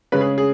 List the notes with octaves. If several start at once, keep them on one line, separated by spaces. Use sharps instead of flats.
C#3 G#3 C#4 B4
G#4
G#4